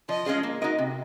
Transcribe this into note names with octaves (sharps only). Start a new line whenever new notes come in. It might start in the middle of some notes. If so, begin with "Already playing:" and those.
F3 D#5
G#3 C#4 F4 G#4
A#3
D#4 F#4 A#4 D#5
C3